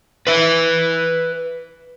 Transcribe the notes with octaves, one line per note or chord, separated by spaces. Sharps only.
B4 E5